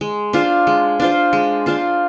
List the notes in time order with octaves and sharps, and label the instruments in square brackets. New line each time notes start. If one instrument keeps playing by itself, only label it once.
[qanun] G#3
D4 F4 C5
G#3
D4 F4 C5
G#3
D4 F4 C5